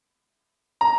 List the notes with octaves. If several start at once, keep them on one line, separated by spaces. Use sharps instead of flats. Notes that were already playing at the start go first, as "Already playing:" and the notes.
A#5